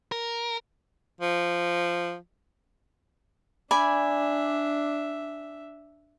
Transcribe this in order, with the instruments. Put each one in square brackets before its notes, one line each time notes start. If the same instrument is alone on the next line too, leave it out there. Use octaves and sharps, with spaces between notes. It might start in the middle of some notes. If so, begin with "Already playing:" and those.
[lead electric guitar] A#4
[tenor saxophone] F3
[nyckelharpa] D4 E5 [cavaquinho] D5 G#5 B5